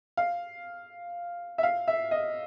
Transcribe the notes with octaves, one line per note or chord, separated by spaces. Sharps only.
F5
E5
F5
E5
D#5